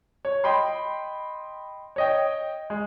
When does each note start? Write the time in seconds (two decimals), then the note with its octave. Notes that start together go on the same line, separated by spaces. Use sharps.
0.25 C#5
0.44 D#5 G5 B5 C6
1.96 C#5 D#5 G5
2.70 G#3